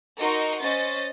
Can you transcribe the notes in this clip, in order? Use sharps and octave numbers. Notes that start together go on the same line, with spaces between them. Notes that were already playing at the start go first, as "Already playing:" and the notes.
D#4 F#4 A#4 D#5 C6 C#6
C#4 C5 D#5 A6